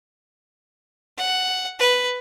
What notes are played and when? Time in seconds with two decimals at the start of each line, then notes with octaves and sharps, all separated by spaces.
1.18 F#5
1.79 B4